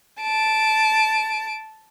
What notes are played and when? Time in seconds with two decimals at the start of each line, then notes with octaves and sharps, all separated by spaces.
0.21 A5 D7